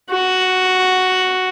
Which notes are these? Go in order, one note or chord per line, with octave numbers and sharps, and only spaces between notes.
F#4